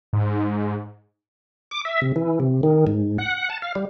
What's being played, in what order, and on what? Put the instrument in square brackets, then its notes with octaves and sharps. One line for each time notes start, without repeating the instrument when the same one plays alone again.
[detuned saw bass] G#2
[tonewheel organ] D6
E5
C3
E3
C3
D#3
G#2
F#5
A5
F5
G3